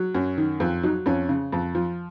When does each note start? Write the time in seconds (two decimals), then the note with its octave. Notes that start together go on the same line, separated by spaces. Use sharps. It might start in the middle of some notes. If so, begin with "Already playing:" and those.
Already playing: F#3
0.15 F#2
0.38 D#3
0.60 F2
0.83 F#3 D#4
1.06 F2 C#4
1.29 C#3
1.52 F2
1.75 F3